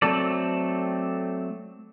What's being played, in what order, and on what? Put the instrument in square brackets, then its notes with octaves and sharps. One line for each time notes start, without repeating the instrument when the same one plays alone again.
[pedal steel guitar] F#3 A3 C4 A4 D5